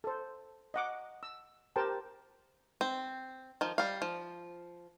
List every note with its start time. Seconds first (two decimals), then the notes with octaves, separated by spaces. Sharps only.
0.04 A4 C5
0.74 D#5 F#5 D6
1.23 E6
1.76 G4 A#4 C5 G5 A5
2.81 C4
3.61 D#3 F3
3.78 G3 F5
4.02 F3